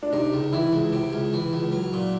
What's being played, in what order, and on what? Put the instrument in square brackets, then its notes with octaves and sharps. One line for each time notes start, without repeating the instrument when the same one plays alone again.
[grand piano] D4
[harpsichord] C3 [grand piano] D#4
[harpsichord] C#2
[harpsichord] E3 [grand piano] E4
[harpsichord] C#2
C3
C#2
E3
C#2
F#3
A#2